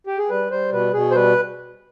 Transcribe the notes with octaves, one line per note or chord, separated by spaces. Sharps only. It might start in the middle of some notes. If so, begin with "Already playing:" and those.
G4
G#4
G3 B4
G3 C5
B2 B4
B2 G#4
C5
G3 B4